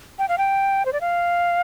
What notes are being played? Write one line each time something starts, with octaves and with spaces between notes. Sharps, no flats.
G5
F5
G5
C5
D5
F5